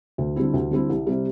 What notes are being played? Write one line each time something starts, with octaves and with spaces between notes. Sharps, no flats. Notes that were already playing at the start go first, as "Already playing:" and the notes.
D2
D3 G3 C4 E4
D2
D3 G3 C4 E4
C2
C3 G3